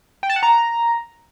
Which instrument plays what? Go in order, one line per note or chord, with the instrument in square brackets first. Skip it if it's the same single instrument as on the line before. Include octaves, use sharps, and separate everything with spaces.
[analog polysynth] G5
A5
F#5
A#5